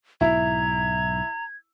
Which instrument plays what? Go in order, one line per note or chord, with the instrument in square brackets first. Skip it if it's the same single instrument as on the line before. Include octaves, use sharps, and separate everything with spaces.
[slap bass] B1 G#2 [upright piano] E4 [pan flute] A#5 [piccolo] G#6